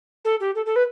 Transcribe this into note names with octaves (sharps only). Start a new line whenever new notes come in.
A4
G4
A4
A4
B4